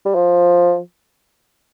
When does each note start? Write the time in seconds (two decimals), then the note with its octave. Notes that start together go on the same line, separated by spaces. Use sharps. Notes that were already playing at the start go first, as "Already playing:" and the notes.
0.05 G3
0.15 F3